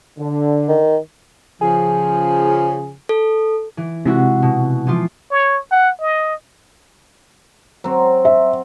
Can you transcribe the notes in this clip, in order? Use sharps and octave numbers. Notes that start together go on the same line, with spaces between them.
D3
D#3
C#3 F3 G#4
A4
E3
C3 G#3 E4 F#4
B2
E3 F3 F4
C#5
F#5
D#5
F#3 C4
E5